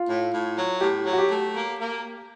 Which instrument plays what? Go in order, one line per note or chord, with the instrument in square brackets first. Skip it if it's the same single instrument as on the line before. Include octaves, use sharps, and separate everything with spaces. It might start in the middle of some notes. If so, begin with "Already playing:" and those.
Already playing: [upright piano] F4
[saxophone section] A2
A2
F#3
[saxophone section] A2 [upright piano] G4
[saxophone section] F#3
[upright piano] F#4
G4
[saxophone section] A3
A#3
A#3